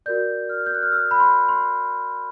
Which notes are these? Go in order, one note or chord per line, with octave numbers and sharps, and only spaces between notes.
F#4 A#4 D5 G6
F6
G6
F#6
F6
E6
B5
C6
C6